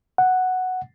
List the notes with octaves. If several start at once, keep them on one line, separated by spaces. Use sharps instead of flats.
F#5